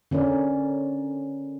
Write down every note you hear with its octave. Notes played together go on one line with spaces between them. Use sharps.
D3 C#4 A#4 D5